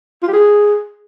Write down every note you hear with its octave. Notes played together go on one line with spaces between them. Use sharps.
F4
G4
G#4